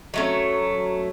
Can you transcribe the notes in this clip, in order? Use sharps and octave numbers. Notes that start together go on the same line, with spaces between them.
F#3 A3 C#4